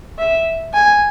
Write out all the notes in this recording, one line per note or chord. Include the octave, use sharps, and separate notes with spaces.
E5
G#5